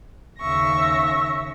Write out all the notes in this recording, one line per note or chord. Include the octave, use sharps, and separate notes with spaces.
D#2 C#3 E5 C#6 A#6